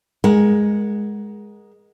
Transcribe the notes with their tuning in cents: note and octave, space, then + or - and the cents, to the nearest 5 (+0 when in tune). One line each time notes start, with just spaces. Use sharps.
G#3 +0 A#4 +20 F#5 +0